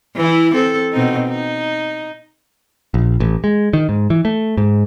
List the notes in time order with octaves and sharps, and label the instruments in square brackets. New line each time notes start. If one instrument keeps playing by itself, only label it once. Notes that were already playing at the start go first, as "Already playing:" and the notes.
[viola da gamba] E3 E4
C4 A4
B2 C4 D#4
D#4
[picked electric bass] A#1
A1
G#3
D#3
G#2
E3
A3
G#2